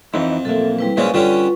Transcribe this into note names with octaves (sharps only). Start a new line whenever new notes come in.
F2 E3 D#4 E4
B1 A#3 A4 E5
G3 E4 B4
A#1 G#3 C#4 B4 C5 D5 F5 C#6
D3 G3 C#4 F4